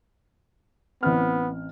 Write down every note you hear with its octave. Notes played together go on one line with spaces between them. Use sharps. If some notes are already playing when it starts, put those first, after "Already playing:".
A1 B3 C4 F6